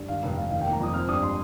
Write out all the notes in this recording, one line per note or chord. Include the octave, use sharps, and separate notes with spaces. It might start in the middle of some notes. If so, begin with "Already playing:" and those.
Already playing: G2
D#3 F5
F1 G5
F1 F5
D#3 F5
G5
A#3
A#5
F2 D#6
C4 F6
G2 D#6
C6